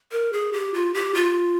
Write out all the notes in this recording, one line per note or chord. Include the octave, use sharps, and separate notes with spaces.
A#4
G#4
G4
F4
G4
F4